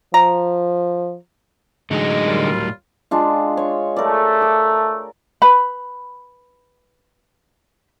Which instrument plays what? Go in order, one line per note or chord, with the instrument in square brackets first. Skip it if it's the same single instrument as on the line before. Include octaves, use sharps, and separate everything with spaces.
[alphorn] F3 [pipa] A#5
[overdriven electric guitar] A2 F#3 [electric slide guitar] D3 D#4 [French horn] G#3
[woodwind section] D#2 G3 F4
[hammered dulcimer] G#3 D4 F4
C#5
[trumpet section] A3 [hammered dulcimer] A#4 D5
[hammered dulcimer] D6
[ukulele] B4 B5